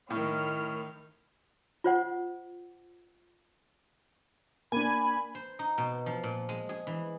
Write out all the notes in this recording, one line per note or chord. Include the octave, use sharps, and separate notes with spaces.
A2 D#3 F6
F4 C5 F#5
A#3 D4 G#5 B5
C5
D#4
B2
F3
A#2
G#3
G#4
E3